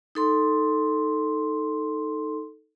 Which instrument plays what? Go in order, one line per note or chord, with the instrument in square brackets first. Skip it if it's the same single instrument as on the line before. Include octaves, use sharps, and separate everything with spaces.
[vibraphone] D#4 A4 C6